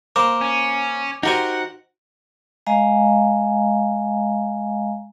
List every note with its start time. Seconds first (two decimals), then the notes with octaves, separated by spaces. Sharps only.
0.16 A#3 A#4 C5 D6
0.41 C#4
1.23 D#4 F#4 G4 A#4 C5 F#5 G#5
2.67 G#3 D#5 F5 G#5 A#5